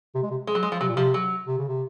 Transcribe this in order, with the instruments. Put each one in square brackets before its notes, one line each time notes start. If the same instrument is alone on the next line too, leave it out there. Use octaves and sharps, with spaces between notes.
[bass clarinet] C3
G#3
C3
[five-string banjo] G#3
F#3
G#3
F3
[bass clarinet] C3 [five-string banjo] F#3
[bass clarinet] A#2
[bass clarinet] C3 [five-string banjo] F3
[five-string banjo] F#3
[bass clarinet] C3
C#3
C3